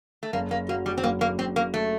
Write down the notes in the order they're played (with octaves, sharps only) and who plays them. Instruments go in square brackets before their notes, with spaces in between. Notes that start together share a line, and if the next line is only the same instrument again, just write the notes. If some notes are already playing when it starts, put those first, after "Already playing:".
[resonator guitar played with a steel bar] A3
[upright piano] F#1 [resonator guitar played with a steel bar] A#3
[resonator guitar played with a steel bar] A#3
[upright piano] F#3 [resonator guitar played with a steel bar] A#3
[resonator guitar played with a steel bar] G3
C4
[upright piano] F#1 [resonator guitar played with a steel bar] A#3
[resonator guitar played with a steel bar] A#3
[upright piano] F#1 [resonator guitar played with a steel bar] C4
[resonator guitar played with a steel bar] A#3
A3